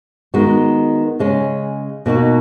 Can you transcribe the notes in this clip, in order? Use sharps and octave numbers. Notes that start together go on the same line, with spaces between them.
D#3 G#3 B3 F#4
C#3 G#3 C#4
B2 A#3 D#4 F#4